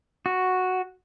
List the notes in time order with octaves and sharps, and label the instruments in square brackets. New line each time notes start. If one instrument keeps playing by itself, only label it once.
[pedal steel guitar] F#4